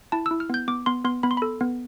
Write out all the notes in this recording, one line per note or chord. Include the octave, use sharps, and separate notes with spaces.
E4 A5
E6
E4
F6
B3 G6
B3 D6
B3 C6
B3 C6
B3 B5
C6
A4 B5
B3